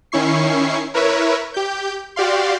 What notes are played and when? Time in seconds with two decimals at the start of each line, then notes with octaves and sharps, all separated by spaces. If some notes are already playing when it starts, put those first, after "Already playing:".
0.12 D#3 C#4 E4 C#6 C7
0.94 E4 A#4 B4 C#5 E5
1.54 G4 G6
2.16 F#4 G4 D5 F5 C6